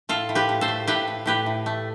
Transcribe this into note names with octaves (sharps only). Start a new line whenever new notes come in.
A2 F4 A4
A2
G4 B4
A2
A4 C5
A3
A2 G4 B4
A2
A2 G4 B4
A2
A3